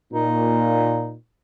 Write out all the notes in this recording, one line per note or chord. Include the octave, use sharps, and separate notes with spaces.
A#2 D#4